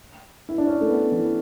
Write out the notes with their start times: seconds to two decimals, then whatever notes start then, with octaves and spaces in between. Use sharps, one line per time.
0.49 E4
0.58 D4
0.67 C#4
0.81 A3
0.89 B3
1.12 E3